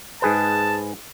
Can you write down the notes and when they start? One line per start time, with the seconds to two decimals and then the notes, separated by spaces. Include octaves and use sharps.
0.22 G#2 G#4 B4 A5